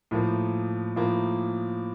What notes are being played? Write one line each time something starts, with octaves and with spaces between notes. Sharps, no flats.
A2 F3 A#3
A2 F3 A#3